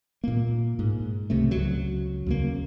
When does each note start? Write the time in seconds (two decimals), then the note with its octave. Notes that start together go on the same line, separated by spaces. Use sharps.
0.24 A#2 A#3
0.79 G#2
1.30 C#2 C3 A3
1.51 C#2 F#3
2.27 D#2 C#3 A#3